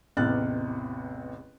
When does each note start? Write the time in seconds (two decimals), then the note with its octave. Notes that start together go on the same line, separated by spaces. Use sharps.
0.17 A1 E2 C3 F6 F#6 A6